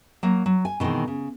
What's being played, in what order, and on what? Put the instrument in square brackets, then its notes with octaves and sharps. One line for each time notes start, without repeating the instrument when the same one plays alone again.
[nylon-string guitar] F#3 A#3
F#3
G#5
B2 D#3 E3 G#3 C4
C#3